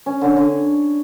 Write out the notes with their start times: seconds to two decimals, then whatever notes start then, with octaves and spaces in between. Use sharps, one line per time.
0.06 C#4
0.21 D3
0.36 D3